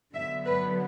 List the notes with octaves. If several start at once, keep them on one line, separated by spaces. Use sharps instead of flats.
D3 F#3 B3 E5
B4